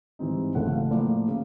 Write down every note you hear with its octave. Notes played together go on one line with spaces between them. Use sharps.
G#2 E3 G3 C4 D#4
F#1 F#2 C#3 E3 A3 F#5
F5
A2 F3 A#3 D5
C#3